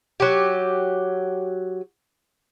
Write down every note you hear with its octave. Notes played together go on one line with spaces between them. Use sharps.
F#3 G4